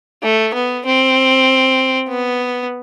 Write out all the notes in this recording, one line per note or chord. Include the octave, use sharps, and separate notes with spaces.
A3
B3
C4
B3